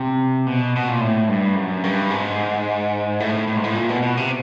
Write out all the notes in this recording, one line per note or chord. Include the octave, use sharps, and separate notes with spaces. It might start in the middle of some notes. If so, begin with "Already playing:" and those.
Already playing: C3
B2
B2
A#2
A2
G2
F#2
G2
G#2
A2
A2
G#2
A2
A#2
B2
B2
C3